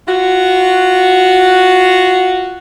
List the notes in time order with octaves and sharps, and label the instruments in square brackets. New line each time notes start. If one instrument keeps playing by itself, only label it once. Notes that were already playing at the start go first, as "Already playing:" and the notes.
[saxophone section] F4 F#4